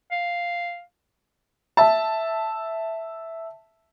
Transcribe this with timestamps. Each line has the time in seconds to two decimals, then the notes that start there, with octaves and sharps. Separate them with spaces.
0.12 F5
1.77 E5 A5